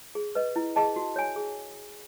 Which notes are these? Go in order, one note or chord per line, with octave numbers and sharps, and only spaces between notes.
G#4
B4 D#5
E4
G#4 D#5 A5
F#4
C#5 G#5
G#4